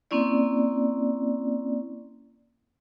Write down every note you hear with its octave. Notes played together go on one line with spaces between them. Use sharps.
A#3 C4 C#4 E4 D5